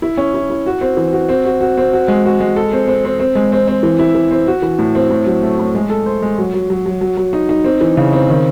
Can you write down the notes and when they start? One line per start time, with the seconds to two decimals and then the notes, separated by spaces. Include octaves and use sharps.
0.02 E4
0.17 C#4
0.34 E4
0.50 E4
0.66 F#4
0.81 C4
0.97 E3
1.13 F#4
1.29 C4
1.45 F#4
1.61 F#4
1.77 C4
1.93 F#4
2.08 G#3
2.25 F#4
2.40 G#3
2.56 A4
2.73 C4
2.88 C4
3.05 C4
3.20 C4
3.35 G#3
3.52 C4
3.68 C4
3.83 E3
3.99 E4
4.15 E3
4.31 C4
4.47 F#4
4.62 E3
4.79 A2
4.95 C4
5.10 A2
5.26 F#3
5.43 A3
5.59 A2
5.75 G#3
5.90 A4
6.06 C5
6.22 G#3
6.38 F#3
6.54 F#3
6.70 F#3
6.86 F#3
7.01 F#3
7.17 F#3
7.33 D#4
7.49 D#4
7.64 C4
7.81 E3
7.97 C#3
8.13 C4
8.29 D#3